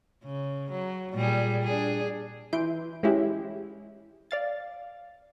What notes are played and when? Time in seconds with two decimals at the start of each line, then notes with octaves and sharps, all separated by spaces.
0.24 C#3
0.71 F#3
1.14 A#2 G3 G#4
1.62 D4 G#4
2.53 E3 C6 G6 D7
3.03 G#3 C#4 E4 G4
4.31 D5 F5 A6